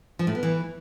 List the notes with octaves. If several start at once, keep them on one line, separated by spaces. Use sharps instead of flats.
F3
A2
B3
E3